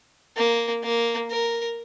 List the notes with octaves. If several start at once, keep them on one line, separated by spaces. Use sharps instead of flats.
A#3
A#3
A#4